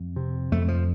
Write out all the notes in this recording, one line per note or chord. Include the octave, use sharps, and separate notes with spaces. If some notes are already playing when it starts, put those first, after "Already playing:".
Already playing: F2
C3
F2 A3
F3